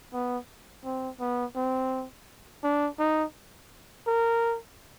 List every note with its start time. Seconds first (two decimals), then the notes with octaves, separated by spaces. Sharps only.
0.13 B3
0.85 C4
1.20 B3
1.56 C4
2.64 D4
2.99 D#4
4.07 A#4